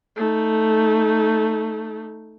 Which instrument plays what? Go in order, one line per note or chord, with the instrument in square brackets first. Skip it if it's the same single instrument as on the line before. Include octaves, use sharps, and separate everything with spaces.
[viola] A3 D#4